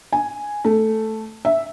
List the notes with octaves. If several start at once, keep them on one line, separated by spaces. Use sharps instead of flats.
G#5
A3
E5